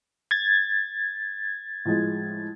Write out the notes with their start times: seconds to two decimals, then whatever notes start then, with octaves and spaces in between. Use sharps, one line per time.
0.31 G#6 A6
1.85 A2 F3 G#3